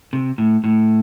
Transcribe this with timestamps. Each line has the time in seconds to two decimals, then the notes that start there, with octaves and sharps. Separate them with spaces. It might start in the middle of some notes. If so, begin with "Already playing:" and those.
0.13 C3
0.38 A2
0.64 A2